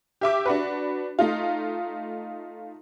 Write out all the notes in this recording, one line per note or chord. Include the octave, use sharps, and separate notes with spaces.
G4 E5 D6
D4 F#4 B4
A3 D#4 F4